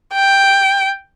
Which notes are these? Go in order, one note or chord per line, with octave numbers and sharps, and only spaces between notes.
G5